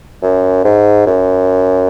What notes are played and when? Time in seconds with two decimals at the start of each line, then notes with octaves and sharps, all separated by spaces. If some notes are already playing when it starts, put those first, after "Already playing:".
0.23 F#2
0.64 G#2
1.06 F#2